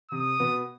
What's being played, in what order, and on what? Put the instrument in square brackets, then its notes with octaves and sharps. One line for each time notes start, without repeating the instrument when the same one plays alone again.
[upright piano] C3 C4 [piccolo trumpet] D#6
[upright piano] B2 B3